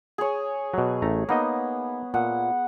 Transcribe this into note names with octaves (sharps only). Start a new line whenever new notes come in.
G#4 C#5
B2 F#3
A1 A3 A#5
A#3 B3 D#4 D#5
A#2 F#5